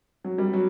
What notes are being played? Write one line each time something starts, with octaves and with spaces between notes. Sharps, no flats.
F#3
G3
F#3